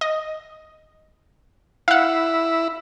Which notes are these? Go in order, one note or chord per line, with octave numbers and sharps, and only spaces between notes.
D#5
E4 F5 F#5